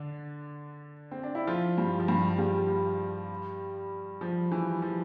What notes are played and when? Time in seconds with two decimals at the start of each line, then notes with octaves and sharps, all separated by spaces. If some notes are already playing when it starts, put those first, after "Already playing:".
Already playing: D3 D4
1.11 C4
1.23 D4
1.35 E4
1.47 F3 F4
1.78 G2 G3
2.00 F3
2.08 G2 G3
2.38 G2 G3
4.21 F3
4.52 E3
4.82 F3